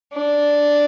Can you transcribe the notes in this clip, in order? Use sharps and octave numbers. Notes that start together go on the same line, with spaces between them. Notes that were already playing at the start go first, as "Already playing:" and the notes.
D4